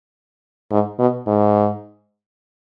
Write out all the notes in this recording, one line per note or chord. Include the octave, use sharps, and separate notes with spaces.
G#2
B2
G#2